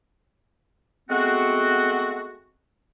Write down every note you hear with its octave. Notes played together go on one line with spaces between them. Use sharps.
G#3 A3 B3 C4 F#4